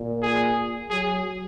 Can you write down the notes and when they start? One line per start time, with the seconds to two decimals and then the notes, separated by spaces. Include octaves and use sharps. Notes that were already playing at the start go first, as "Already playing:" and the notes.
Already playing: A#2
0.22 G#4
0.90 F#3 G#4